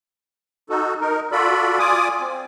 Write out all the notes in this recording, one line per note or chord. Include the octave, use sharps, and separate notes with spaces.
D#4 F#4 A4
D#4 A#4
F4 F#4 A4 D5 B5
F4 D5 G#5 D6 D#6
C4